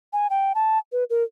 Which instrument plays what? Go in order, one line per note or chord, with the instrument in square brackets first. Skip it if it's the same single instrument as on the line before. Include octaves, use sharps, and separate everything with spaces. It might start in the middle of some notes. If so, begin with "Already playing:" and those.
[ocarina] G#5
G5
A5
B4
A#4